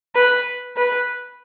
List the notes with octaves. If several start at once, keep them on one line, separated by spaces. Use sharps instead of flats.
B4
B4